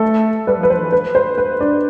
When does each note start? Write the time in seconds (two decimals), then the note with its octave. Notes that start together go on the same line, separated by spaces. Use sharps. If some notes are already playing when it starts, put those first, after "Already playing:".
Already playing: A3 A4
0.47 G3 B4
0.59 F3
0.63 B4
0.70 F3 C5
0.81 E3
0.92 B4
1.15 C5
1.38 B4
1.60 D4